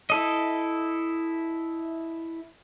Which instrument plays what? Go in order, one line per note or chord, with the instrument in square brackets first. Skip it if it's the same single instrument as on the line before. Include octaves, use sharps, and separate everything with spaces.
[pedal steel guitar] E4 A4 D#5